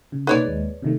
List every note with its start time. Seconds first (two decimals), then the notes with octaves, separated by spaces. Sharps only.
0.12 C#3
0.27 B2 A#3 D#4 B4 C#5 D5
0.44 D#2 G#3
0.82 C3 D#3 A3